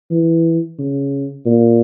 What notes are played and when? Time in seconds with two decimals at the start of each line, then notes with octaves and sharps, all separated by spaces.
0.11 E3
0.79 C#3
1.46 A#2